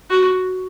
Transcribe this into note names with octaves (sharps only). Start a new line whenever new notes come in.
F#4